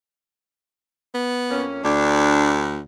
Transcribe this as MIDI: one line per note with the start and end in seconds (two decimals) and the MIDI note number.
1.14 1.64 59
1.50 1.81 41
1.50 1.81 58
1.50 1.81 61
1.84 2.80 38
1.84 2.55 62